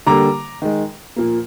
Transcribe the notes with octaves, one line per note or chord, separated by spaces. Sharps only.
D3 G3 A#3 A#5 D6
D#3 G#3
A#2 F3 A#3